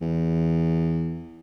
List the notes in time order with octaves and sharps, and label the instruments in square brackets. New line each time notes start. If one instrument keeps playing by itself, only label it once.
[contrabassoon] E2